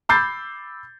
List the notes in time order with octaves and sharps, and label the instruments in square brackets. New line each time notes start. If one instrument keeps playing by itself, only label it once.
[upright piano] B5 D6 E6 G6 A6 C7